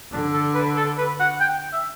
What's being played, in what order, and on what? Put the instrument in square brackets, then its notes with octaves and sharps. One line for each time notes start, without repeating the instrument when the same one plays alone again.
[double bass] D3 [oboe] D4
[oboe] A4
B4
A4
B4
F#5
G5
E5